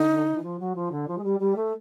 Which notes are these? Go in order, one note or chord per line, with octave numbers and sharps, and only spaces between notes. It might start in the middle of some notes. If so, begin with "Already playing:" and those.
Already playing: D3 D#4
E3
F3
F#3
F3
D3
F3
G#3
G3
G3
A3